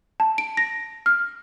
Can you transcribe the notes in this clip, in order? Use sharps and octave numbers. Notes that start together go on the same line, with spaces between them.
A5
D7
A#6
F6